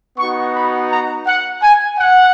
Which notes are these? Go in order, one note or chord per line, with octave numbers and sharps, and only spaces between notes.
B3 D#4 F#4 C#6
B5
A#5
F#5
G#5
F#5